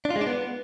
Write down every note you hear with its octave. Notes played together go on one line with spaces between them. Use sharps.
D4
F4
G#3
D4
B3